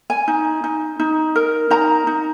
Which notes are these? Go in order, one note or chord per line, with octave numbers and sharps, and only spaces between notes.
G#5
D#4
D#4
D#4
A#4
D#4 A#5
D#4